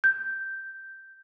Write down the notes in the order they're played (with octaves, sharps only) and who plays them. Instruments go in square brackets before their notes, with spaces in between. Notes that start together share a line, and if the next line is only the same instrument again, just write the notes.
[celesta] G6